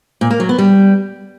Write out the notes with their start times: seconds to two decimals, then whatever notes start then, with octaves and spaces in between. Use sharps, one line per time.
0.21 A#2
0.30 A#3
0.40 F#3
0.49 B3
0.58 G3